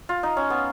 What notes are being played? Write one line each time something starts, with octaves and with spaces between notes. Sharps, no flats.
F4
D#4
C#4
B3